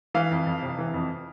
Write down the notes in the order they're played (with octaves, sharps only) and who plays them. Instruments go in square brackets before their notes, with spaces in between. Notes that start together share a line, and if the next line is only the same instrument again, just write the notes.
[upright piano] E3 F5
F2
F2
C3
E3
F2